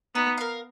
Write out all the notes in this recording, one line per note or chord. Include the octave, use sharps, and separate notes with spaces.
B3 D#4
A#4 F5